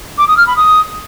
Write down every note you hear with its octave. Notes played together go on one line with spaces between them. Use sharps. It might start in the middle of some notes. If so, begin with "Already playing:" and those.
D6
D#6
F6
B5
D#6